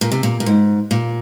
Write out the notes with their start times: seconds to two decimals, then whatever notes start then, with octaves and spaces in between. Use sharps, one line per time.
0.01 A#2
0.12 C3
0.23 A#2
0.40 A#2
0.46 G#2
0.91 A#2